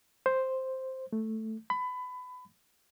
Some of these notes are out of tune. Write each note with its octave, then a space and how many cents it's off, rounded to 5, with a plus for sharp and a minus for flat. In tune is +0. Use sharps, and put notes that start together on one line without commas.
C5 +0
A3 +0
B5 +25